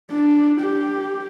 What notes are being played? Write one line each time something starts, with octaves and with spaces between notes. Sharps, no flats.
D4
G4